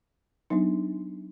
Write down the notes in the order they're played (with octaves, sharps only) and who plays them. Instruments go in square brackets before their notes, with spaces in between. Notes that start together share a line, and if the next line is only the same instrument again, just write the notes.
[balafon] F#3 B3 D4 D#4